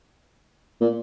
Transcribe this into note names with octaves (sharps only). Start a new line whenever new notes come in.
A#2